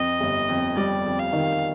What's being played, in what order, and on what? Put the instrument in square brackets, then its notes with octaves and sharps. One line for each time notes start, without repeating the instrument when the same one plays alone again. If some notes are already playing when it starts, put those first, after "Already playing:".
Already playing: [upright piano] F2 [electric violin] D#5
[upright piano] G1
F2
[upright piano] G3 [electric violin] D5
[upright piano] F2
[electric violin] F5
[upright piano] D#3